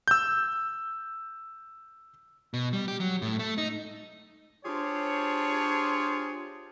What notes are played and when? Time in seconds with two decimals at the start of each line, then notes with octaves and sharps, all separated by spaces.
0.08 E6 G6
2.54 B2
2.73 G3
2.88 G4
3.00 F#3
3.22 A2
3.39 A3
3.58 D#4
4.65 D4 F4 G4 G#4 C5 C#5